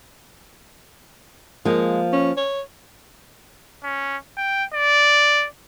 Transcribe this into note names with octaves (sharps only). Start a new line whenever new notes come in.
F3 G#3 A#3
C#4
C#5
C#4
G5
D5